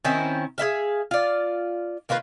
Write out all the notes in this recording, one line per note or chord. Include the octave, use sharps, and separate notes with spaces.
D#3 C4 C#4 E4
G#4 B4 E5 F5
F4 D5
D#3 A#3 F4 B4